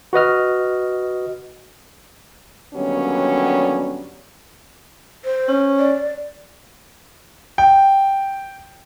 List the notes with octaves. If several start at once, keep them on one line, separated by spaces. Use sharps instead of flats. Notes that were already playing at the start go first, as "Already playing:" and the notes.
F#4 B4 D#5 F6
D#2 D3 F#3 G3 B3 C#4
C5
C#4
D5
G5